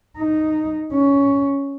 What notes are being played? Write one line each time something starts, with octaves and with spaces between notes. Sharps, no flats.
D#4
C#4